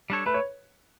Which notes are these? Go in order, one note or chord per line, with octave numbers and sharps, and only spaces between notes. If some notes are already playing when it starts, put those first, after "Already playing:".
G3 D4 A4 C#5
A3 B4
C#5